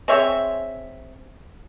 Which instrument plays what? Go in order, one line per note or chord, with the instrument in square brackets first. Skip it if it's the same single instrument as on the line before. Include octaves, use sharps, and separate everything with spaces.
[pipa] C4 G#4 C#5 E5